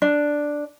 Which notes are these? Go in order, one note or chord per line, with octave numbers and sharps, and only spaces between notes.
D4